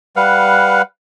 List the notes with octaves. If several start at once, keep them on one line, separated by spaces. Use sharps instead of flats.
G3 B4 F5 F#5